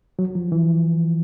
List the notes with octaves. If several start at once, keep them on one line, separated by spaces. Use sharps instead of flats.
F#3
F3
E3